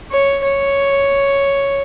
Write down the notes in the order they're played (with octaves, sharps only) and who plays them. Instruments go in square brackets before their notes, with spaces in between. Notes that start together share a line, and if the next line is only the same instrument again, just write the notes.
[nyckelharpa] C#5
C#5